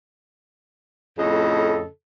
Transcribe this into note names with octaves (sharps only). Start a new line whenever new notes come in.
F2 A2 C#3 A4 D#5